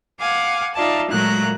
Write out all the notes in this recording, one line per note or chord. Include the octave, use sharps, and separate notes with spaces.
F5 F#5 G#5 D6
D#4 F4 D5 E5 A5
A#2 F#3 G#3 A3 A#5 F#6